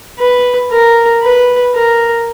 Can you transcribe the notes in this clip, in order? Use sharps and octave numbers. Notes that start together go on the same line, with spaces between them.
B4
A#4
B4
A#4